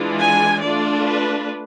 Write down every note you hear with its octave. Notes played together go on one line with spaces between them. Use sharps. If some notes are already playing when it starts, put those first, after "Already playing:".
Already playing: E3 G#3 D4 F4
G#5
A3 D4 F4 D5
B4